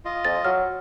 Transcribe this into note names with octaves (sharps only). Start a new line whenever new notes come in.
F4 D#5
F2 A6
F#3 F6